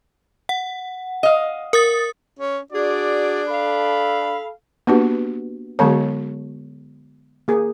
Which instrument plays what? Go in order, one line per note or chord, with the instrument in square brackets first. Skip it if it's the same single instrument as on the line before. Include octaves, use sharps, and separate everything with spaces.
[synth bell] F#5
[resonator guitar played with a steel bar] D#5 F5
[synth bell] A#4 D#6 A6
[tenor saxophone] C#4
[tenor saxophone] D4 [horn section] F#4 G#4 D5
[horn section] A4 F5 B5
[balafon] A#3 D4 G4 [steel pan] B3 F#4
[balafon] D3 B3 A5 [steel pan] F#3 G#3 C#5
[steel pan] A#3 G#4